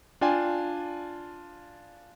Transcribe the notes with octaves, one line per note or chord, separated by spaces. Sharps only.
D4 F4 D5 G5 G#5